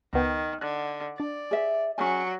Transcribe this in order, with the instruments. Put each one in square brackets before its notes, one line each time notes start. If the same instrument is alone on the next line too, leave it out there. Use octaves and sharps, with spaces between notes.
[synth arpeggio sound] C#2 B3 G5 [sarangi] D#3
[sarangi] D3 [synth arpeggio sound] F#6
[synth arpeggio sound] D4 A6 [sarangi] D5
[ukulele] G#4 E5
[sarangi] F#3 [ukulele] C#4 G#4 G#5